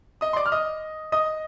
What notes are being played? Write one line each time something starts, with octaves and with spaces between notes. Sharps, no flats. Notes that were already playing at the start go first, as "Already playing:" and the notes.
D#5 D#6
C6
D5 D6
F6
D#5 D#6
D#5 D#6